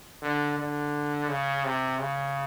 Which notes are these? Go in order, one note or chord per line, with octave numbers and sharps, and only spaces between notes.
D3
D3
C#3
C3
C#3